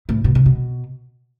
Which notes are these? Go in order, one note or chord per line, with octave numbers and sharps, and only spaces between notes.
A2
B2
C3
B2